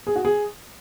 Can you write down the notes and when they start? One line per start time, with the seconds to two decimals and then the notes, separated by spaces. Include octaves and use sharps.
0.07 G#4
0.16 F#4
0.25 G#4